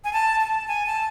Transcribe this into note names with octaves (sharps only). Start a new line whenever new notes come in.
G#5
A5
A5
G#5
A5